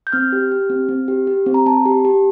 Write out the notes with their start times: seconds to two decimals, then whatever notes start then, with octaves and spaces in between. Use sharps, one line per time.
0.07 G6
0.12 C4 F6
0.33 G4
0.52 G4
0.70 C4
0.89 C4
1.08 G4
1.27 G4
1.46 C4
1.54 A#5
1.66 C4 A5
1.86 G4
2.05 G4